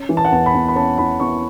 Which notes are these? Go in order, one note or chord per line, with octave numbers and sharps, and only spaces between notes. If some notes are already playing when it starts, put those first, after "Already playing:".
Already playing: C#4
E3
A5
F#5
E2 A5
B5
E2
B5
C#4 A5
E3 B5
E2 C#6